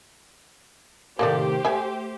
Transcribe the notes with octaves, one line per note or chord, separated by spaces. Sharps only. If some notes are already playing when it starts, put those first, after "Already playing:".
A2 C3 D#3 A#3 G4 A4 C5 D5
A3 E5 G#5